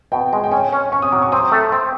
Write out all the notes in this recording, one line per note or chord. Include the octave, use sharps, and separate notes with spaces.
B2 G5
G#3
G5
C#4 G#5
C#4
C#4 C#6
D#6
F#3 D6
C#6
C4 D#6
A3
C4